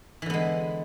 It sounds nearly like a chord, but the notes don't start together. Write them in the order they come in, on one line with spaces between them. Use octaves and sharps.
E3 D3 B3 G#3